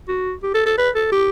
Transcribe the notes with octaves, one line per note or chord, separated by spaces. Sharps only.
F#4
G4
A4
A4
B4
A4
G4